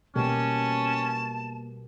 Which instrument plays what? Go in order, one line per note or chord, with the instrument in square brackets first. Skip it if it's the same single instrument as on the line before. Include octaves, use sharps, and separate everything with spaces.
[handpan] B2 G4 A#4 [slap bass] G3 A#3 [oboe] C#4 [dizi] A5